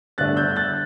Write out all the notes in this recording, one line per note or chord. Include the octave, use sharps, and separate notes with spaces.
G1 G2 D3 A3 D4 F#6 A6
E6 G6
F#6 A6